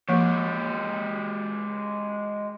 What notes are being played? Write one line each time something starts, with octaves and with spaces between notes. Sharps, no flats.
F3 G#3 A#3 G4